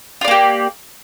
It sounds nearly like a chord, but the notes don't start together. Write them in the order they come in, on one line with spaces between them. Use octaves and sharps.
F4 D5 A#3 G4